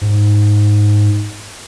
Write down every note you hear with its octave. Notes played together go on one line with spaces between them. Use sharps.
G#2